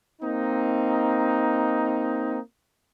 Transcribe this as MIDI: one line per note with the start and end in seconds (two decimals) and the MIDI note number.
0.22 2.38 58
0.22 2.38 60
0.22 2.38 63